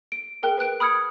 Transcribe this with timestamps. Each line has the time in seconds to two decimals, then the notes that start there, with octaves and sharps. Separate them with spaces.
0.12 D7
0.43 G#4 A#4 G5 F#6
0.58 B4 G5 F#6 D7
0.80 B5 D#6 F6 G#6 C#7